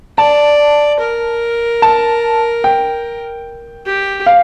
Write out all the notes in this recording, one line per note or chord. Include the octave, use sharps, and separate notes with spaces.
D5 A5
A#4
A5
G5
G4
F5